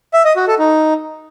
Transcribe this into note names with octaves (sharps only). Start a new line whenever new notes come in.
E5
D#5
F#4
A4
D#4